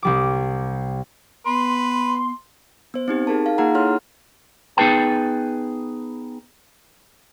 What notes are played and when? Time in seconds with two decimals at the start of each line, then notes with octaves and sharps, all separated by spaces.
0.03 C2 G3 D6
1.45 B3 B4 C6
2.94 B3 C5
3.08 C4 D#4 G4
3.27 D#4 G#4 A#4 A5
3.46 F5
3.58 A#3 D#4 F4 G#4 F#5 A#5
3.75 E4 A4 C#5 F#5 C6 F6
4.77 B3 D#4 G#4 B4 G5 A5